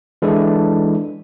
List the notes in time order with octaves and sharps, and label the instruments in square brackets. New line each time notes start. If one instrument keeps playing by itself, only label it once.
[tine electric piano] E3 G#3 D4 E4 A4